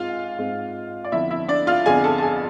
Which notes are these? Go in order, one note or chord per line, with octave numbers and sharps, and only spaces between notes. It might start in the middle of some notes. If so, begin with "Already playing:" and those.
Already playing: G#2 G#3 C4 F4 F5
G#2 G#3 C4
D5
F2 D3 F3 B3 D4 E4 E5
E4 E5
D4 D5
F4 F5
F2 D3 F3 B3 D4 G#4 G#5
A4 A5
A5
G#4 G#5